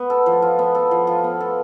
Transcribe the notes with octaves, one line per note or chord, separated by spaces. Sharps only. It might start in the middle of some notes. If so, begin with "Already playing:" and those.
Already playing: B3
A4
F3
F4
B3
A4
F3
F4
B3
A4